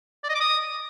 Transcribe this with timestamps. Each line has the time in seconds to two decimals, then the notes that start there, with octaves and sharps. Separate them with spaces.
0.24 D5
0.29 D#5
0.35 D6
0.40 D#6